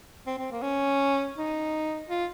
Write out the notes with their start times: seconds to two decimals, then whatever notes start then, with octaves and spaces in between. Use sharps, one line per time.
0.27 C4
0.38 C4
0.51 A#3
0.62 C#4
1.36 D#4
2.09 F4